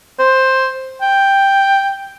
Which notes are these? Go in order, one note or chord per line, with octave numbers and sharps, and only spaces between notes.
C5
G5